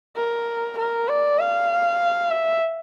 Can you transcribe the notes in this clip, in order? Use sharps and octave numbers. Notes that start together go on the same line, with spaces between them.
A#4
A#4
D5
F5
E5